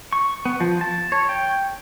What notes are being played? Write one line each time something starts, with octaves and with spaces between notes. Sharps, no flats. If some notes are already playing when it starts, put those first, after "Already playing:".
C#6
B3
F3
A5
C#5
G5